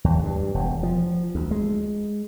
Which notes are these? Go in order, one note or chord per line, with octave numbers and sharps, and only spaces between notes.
D#2
G2
E1
F3
D2
G#3